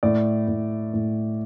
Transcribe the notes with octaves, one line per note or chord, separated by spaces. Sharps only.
A2 D5
A2
A2